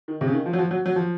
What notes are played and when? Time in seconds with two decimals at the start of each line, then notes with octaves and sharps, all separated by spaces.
0.08 D#3
0.21 C3
0.27 C#3
0.34 D#3
0.46 F3
0.53 F#3
0.58 F3
0.71 F#3
0.86 F#3
0.96 F3